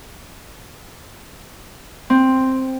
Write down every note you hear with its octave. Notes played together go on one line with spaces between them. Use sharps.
C4